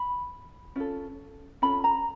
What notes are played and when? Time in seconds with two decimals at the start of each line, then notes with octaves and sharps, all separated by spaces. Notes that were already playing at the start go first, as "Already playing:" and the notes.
Already playing: B5
0.76 C#4 F4 A4
1.62 C#4 F4 A4 B5
1.84 A#5